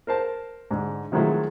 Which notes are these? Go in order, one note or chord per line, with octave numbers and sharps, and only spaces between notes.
A#4 C5 A5
G#2 D3
D#3 F3 F#3 G#3 A3 E4